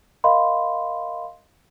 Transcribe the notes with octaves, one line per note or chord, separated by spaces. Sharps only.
A#4 D#5 F5 B5 C6